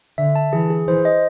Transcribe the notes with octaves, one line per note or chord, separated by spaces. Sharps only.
D3 E5
A5
E3 G#4
G#4
E3 C5
D#5